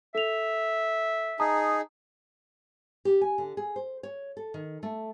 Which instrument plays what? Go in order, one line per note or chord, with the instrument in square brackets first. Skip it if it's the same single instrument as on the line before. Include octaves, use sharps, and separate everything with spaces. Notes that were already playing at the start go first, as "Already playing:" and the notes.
[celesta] A4 F7 [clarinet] E5
[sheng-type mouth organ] D#4 G#4 [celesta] A5 A#5 D#6
[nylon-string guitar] G4
G#5
D3
G#4
C5
C#5
A4
D#3
A3